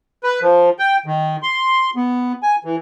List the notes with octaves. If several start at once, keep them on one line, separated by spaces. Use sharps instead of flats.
B4
F3
G5
D#3
C6
B3
G#5
E3